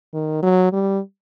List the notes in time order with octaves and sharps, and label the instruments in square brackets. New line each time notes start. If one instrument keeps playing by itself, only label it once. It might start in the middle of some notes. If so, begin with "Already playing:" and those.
[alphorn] D#3
F#3
G3